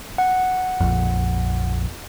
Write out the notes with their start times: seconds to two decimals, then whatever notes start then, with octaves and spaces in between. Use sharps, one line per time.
0.18 F#5
0.80 A#1 F2